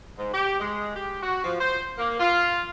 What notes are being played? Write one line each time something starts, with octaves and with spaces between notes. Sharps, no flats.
G#2
G4
G#3
G4
F#4
F3
C5
A#3
F4